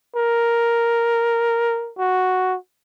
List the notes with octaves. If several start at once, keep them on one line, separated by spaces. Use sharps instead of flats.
A#4
F#4